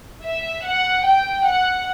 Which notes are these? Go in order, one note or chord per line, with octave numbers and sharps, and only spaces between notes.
E5
F#5
G5
F#5